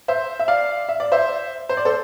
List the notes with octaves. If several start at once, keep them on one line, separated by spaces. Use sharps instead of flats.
C5 E5
E5
D5 F5
E5
D5
C5 E5
C5
D5
A4 C5